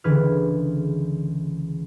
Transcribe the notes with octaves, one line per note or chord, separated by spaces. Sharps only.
C#2 D3 E3 G#4 B4 F6